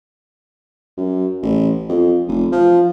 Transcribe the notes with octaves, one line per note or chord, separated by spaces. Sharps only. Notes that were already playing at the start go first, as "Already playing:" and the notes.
F#2
A1
F2
F1
F3